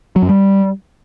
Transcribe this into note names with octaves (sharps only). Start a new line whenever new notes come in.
F#3
F#2
G3